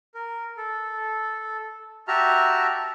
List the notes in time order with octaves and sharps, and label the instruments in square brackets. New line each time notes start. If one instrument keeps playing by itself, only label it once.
[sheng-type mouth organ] A#4
A4
F#4 G4 E5 A5 A#5 F6